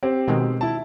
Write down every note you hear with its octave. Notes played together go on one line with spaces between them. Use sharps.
C4 G4 C5
B2 D#3 G#3
E4 A5